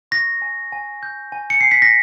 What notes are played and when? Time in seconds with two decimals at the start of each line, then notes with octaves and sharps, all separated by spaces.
0.11 C#6 A#6
0.42 G#5
0.72 G#5
1.03 G6
1.32 G#5
1.50 C#7
1.61 G#5 C7
1.71 B6
1.82 A#6